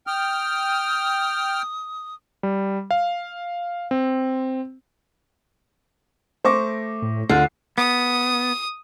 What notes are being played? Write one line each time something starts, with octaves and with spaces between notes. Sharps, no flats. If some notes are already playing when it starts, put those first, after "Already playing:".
G5 D#6 F6
G3
F5
C4
A3 C5 C#6 D6 A#6
A2
D2 D3 F4 F6 C7
B3 D#6